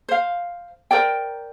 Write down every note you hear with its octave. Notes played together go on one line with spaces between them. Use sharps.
C5 F5
A#4 C5 D5 G5